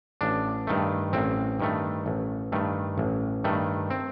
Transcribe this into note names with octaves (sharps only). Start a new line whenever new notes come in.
A1 D4
G2 D#3 A3
A1 C4
G2 D#3 A3
A1
G2 D#3 A3
A1
G2 D#3 A3
C4